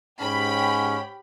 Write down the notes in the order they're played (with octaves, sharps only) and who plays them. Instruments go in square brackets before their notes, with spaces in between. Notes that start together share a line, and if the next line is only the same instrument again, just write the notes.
[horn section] G#2 C#4 [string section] G4 B5